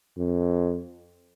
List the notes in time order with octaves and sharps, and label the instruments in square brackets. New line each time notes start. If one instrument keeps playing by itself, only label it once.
[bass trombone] F2